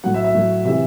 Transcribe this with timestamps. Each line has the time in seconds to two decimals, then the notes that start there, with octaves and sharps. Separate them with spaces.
0.04 A2 F#3 F#5
0.14 E5
0.24 E5
0.35 A2 F#3
0.65 C3 E3 E5